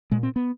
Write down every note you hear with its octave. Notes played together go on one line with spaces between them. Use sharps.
A#2 G#3
C4
B3